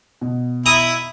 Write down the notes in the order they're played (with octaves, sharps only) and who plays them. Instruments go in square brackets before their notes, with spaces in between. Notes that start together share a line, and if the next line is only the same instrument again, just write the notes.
[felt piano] B2
[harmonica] E4 [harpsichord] A#5 D#6